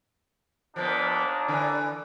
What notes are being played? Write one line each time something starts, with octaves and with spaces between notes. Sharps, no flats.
D#2 A#2 F3 A#3 B3 D4
D3 E3